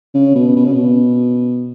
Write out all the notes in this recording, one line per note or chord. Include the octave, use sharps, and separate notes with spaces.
C#3
B2
B2
C#3
B2